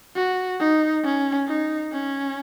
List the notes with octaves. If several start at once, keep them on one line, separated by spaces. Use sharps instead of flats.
F#4
D#4
C#4
D#4
C#4